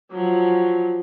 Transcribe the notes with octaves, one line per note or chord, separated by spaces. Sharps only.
F3 F#3